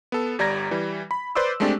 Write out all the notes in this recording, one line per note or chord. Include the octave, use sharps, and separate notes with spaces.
B3 A4
G1 G3 D5 A#5 G#6 A#6
E3 G3
B5
B4 C5 D5 C6 D6 E6
G#3 A3 C4 D4 G4 D5